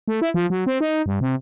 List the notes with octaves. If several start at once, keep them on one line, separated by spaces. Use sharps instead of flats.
A3
E4
F3
F#3
C4
D#4
G2
C3